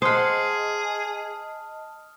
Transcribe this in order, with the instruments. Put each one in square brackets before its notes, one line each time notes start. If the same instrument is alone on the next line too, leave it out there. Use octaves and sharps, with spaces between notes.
[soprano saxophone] G#4 [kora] C5 F#5 [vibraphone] D#5 A5 [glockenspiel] D#6 F6